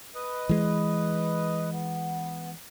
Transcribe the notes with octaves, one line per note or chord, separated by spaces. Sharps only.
B4 D#5
E3 G#3
B3